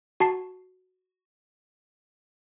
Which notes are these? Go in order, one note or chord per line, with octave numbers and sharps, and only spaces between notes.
F#4 A5 C7